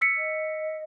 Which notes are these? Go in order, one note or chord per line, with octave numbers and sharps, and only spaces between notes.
E6 B6 C#7
D#5